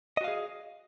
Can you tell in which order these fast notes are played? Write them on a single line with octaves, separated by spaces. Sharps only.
D#5 F#4 F5 G#4